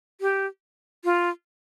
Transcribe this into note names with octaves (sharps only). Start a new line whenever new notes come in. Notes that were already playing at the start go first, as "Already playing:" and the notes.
G4
F4